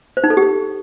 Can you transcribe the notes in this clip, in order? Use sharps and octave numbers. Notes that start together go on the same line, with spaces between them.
C5
D#4
A4
G4